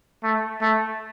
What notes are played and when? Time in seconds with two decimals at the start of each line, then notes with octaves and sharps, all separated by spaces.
0.23 A3
0.61 A3